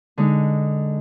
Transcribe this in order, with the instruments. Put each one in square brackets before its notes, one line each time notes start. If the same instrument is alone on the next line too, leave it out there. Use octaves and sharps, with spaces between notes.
[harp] D3 G#3 D#4